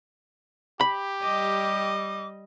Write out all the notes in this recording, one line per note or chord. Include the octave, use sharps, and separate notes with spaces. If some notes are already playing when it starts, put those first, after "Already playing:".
G4 B5
G3 D#5 D6